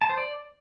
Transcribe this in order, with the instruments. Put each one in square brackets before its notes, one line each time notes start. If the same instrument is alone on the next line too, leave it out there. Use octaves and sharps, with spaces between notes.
[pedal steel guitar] A5
C5
D5